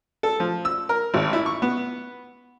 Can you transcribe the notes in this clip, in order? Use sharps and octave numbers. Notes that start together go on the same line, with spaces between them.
A4
F3
E6
A#4
G#1
E4
C#6
B3